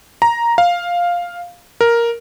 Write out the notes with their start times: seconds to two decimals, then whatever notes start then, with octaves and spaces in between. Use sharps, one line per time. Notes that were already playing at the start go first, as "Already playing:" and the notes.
0.22 A#5
0.58 F5
1.81 A#4